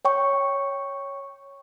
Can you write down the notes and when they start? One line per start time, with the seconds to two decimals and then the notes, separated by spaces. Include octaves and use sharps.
0.05 C#5 G5 C#6